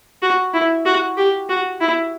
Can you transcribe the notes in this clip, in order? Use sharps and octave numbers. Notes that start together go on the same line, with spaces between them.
F#4
E4
F#4
G4
F#4
E4